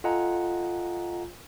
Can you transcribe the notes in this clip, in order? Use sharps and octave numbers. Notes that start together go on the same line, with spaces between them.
F4 A4 D#5 F#5 G#5 A#5